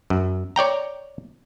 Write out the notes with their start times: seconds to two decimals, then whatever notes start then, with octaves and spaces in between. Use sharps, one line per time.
0.10 F#2
0.56 C#5 D5 G5 A#5